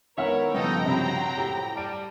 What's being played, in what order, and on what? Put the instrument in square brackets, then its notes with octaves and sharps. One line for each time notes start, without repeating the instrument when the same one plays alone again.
[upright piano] D#3 B3 [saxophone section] E4 C#5 [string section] A#4 [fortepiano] E5 F#5 F6
[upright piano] G2 C#3 F3 [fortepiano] B3 [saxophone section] D#4 A4 [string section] G5 A#5
[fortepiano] C3 B5 [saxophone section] F#3 C4
[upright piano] A2 [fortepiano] G4
[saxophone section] G3 [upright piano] A5 D7